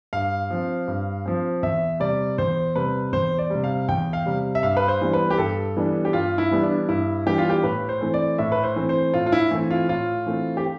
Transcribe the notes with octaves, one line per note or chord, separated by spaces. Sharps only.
G2 F5
F3 C4
G2
F3 C4
E2 E5
C3 G3 D5
E2 C5
C3 G3 B4
E2 C5
D5
C3 G3
F5
E2 G5
F5
C3 G3
E5
G2 F5
B4
C5
E3 G3 B3 D4
B4
G4
G2 A4
E3 G3 B3 D4
G4
G2 F4
E4
E3 G3 B3 D4
D4
G2 E4
E3 G3 B3 D4 G4
F4
G4
A2 B4
C5
E3 A3 C4
D5
A2 E5
B4
C5
E3 A3 C4
C5
A2 F4
F4
E4
E3 A3 C4
F4
A2 F4
E3 A3 C4
G4